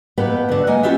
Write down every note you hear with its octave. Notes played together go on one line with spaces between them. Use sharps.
F2 A2 A#3 B3 B4 G5
D2 D3
G#3 A#3 F#5 G#5
C#4 E4 F4 G4 E5